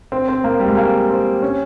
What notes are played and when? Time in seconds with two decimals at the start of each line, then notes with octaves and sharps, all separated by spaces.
0.12 C4
0.28 C4
0.44 A#3
0.59 G3
0.68 G#3
0.77 A#3
1.09 C4
1.42 C#4